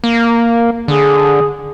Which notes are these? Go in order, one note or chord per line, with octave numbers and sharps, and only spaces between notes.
A#3
D3 G#4